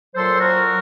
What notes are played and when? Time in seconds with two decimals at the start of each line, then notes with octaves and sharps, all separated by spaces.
0.15 A#2 F#3 A4 C5
0.40 F#4 A#4
0.65 F#3